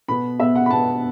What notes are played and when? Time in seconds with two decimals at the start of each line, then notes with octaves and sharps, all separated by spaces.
0.08 B2 B3 B5
0.39 B2 B3 E5
0.55 F#5
0.66 B5
0.70 B2 B3 A5